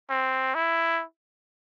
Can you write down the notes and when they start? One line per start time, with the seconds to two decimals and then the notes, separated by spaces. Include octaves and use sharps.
0.10 C4
0.55 E4